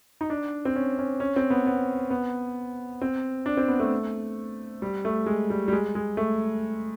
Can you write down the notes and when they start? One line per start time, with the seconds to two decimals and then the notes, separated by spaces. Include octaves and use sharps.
0.21 D#4
0.30 D4
0.65 C4
0.76 C#4
0.99 C#4
1.20 C#4
1.36 C4
1.50 B3
1.66 B3
2.10 B3
3.01 C4
3.46 D4
3.57 C4
3.68 B3
3.80 A3
4.82 G3
5.05 A3
5.26 G#3
5.50 G3
5.68 G3
5.73 G#3
5.95 G#3
6.17 A3